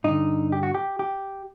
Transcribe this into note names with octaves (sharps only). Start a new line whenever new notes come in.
G2 D3 D#4
G4
F#4
G4
G4